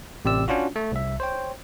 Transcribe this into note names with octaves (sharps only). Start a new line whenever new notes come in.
A1 C3 G4 D5 E6
C#4 D4 F4 F#4
A3
C2 E5
C5 C#5 G5